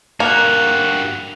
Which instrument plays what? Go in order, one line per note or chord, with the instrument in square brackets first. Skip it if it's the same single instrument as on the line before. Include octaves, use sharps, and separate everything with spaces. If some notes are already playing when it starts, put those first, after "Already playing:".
[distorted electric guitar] G2 F#4 [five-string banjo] A#3 [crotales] F#6 F7